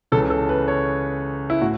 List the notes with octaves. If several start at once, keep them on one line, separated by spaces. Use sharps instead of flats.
C#2 C#3 E3 A4
A4
B4
C#5
E4
A2 F#4